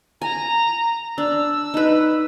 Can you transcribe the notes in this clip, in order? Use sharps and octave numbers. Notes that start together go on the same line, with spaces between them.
G#5 A#5
D4 E6
D#4 B4